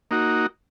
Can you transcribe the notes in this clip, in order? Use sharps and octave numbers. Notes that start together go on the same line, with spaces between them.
A#3 D#4 F#4